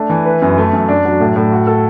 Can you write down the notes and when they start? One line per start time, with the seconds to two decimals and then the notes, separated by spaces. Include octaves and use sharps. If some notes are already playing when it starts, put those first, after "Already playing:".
Already playing: A3 D4
0.10 E3
0.25 B4
0.42 F#2
0.58 A3
0.73 F#2
0.88 D4
1.05 F#3
1.20 A2
1.36 A2
1.52 F#4
1.67 A4